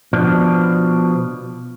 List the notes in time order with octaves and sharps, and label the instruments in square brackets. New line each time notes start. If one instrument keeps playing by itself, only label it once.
[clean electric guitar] B2 F3 D4